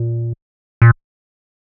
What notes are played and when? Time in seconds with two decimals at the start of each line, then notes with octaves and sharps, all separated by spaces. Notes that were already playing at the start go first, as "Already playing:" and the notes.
Already playing: A#2
0.82 A#2